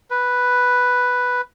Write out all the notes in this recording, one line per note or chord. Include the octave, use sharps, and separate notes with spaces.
B4